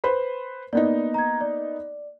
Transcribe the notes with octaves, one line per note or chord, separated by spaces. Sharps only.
B4 C5 B5
A#3 B3 D#4 D5
A#5 G#6
D5